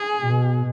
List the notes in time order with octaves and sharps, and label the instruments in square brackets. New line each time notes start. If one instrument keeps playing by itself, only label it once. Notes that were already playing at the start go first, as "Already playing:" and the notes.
Already playing: [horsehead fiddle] G#4
[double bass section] B2